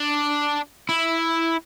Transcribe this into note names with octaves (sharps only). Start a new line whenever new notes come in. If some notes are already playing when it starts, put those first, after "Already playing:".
Already playing: D4
E4